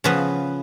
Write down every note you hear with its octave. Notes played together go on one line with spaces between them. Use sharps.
C#3 F3 B3 B4